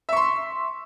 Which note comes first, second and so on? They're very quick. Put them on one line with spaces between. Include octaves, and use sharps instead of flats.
E5 C#6 C6